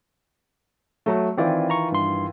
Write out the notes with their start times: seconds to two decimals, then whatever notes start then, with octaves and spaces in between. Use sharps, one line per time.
1.06 F#3 A3
1.37 D#3 E3 C4 F4 D5
1.70 A#5 C#6
1.92 G2 C6